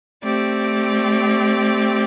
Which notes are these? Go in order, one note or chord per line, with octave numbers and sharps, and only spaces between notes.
A3 C4 G4 D5